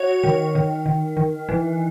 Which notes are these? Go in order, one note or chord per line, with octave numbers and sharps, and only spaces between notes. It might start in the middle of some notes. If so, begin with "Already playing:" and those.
Already playing: F#4 C#5
D#3
D#3
D#3
D#3
E3